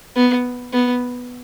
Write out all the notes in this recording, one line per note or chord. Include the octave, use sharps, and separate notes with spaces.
B3
B3